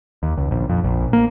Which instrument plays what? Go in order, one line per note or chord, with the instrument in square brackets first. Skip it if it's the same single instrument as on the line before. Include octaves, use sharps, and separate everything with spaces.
[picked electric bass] D#2
C#2
A#1
F2
A#1
A#3